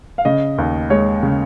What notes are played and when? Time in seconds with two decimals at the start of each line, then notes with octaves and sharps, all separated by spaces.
0.18 F5
0.25 C#3 D#5
0.58 D#2
0.90 G#3 C#5
1.23 C#3